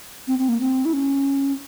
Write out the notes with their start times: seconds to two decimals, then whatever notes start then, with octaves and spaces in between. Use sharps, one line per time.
0.27 C4
0.38 C4
0.49 A#3
0.60 C4
0.85 E4
0.93 C#4